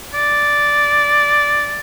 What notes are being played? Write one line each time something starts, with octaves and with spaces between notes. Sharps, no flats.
D5